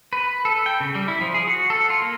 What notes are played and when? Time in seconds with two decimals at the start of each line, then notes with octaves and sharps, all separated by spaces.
0.13 B4
0.45 A4
0.66 G5
0.80 C#3
0.95 G3
1.08 E4
1.21 F3
1.34 G#4
1.47 F#4
1.70 A4
1.90 F4
2.02 A#3